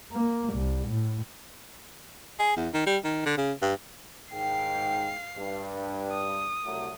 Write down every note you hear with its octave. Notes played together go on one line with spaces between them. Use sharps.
A#3
C2
A2
G#4
E2
D#3
G3
D#3
D3
C#3
G2
G#2 D#3 F5 G5 C7
G2
D#6
C2 F#3 A3